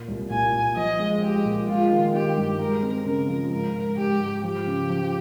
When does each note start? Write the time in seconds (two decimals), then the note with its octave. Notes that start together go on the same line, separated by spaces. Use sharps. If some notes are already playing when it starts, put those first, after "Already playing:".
Already playing: A#2
0.08 C2
0.30 A#2 G#5
0.54 A#2
0.76 F3 D#5
0.99 G#3
1.22 G#3 G4
1.45 A#2
1.68 G#3 F4
1.92 D#3
2.14 D#3 G4
2.37 G2
2.59 G#3 A#4
2.82 C4
3.05 C#3 A#4
3.28 F3
3.52 G#2 A#4
3.74 G#2
3.97 G#2 G4
4.20 G#2
4.43 F3 G4
4.67 C#3
4.90 F3